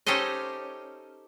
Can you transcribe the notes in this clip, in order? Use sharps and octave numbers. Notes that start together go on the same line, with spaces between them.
C#4 D#4 G4 A4 C5 D#5